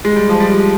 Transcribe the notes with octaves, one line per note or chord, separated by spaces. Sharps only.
G#3
G3
F3
G3